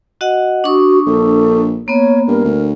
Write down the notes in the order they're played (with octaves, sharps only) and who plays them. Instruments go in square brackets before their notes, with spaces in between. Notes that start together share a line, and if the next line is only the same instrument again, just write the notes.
[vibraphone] F#4 D#5 F#5
[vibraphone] D4 C#6 D#6 [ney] F#4
[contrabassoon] A#1 [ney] A4
[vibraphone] A#3 B3 [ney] C#5
[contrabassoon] G2 [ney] A#4
[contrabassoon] D2